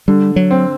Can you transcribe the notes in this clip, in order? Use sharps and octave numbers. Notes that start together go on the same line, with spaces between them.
D3 G3
F#3
C4